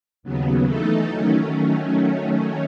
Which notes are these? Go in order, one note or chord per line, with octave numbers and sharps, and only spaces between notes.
D#2 C#3 F#3 B3
E3 A3 D#4 A4
D#3 F#3 A3 C#4